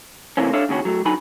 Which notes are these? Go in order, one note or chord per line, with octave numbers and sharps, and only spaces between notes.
C3 E3 A3 A#3 C4 C#4
D4 A4 C#5 E5 F5
D#2 C#3 C#4 F#4
F#3 A3
D3 F#3 D#4 G#5 B5